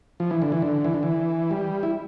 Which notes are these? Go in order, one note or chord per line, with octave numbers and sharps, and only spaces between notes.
F3
E3
D3
E3
D3
E3
D3
E3
G3
E4